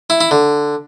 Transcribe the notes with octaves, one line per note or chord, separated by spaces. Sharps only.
E4
E4
D3